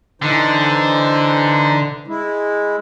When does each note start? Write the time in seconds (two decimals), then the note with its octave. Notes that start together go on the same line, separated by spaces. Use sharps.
0.22 D3 E3 D#4 C5
2.07 G#3 E4